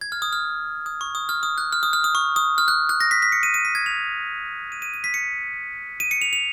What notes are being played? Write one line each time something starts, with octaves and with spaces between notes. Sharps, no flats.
G#6
F6
D#6
F6
D#6
C#6
D#6
F6
D#6
F#6
F6
D#6
F6
D#6
C#6
D#6
F6
F#6
F#6
A#6
B6
B6
C#7
D#7
D#7
B6
G#6
F7
D#7
D#7
D#7
B6
C#7
D#7
C#7
F7
F7